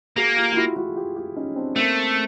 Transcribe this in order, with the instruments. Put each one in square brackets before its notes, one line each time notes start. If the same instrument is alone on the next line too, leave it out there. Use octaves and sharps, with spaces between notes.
[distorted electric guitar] A#3 [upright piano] F#4 G#4
[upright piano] F4 G4
F4
E4 F#4
E4 F#4
F4 G4
F4 G4
C#4 D#4
C4 D4
[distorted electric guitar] A3 [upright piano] A#3 C4